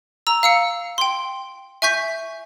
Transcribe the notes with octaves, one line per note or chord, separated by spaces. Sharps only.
A#5 E6
F5 E6 C#7
G5 C6
E5 G#5 C#6 G6 B6